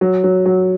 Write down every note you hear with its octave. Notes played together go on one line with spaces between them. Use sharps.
F#3
F#3
F#3